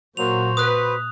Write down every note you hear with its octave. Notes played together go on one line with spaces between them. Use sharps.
A#2 F#3 A#3 F#4 C5 F7
B4 D#6 F#6